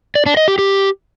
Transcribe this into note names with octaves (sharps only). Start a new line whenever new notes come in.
D5
D4
D#5
G4
G4